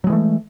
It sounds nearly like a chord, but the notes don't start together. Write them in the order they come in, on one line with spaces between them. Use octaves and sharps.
F#3 G#3 E3 A3